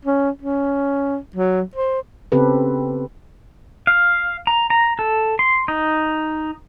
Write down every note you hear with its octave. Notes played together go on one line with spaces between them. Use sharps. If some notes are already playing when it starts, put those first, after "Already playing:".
C#4
C#4
F#3
C5
C#3 B3 C4 G4 A4 B4
F5
A#5
A#5
A4
C6
D#4